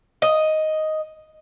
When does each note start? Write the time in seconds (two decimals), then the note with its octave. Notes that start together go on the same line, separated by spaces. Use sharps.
0.22 D#5